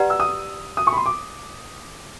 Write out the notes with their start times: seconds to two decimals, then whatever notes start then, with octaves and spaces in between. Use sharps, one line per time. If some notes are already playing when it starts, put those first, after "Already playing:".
Already playing: G4 B4 D5 F#5 A#5
0.10 E6
0.20 D#6
0.77 D#6
0.87 C#6
0.93 B5
0.97 C6
1.06 D6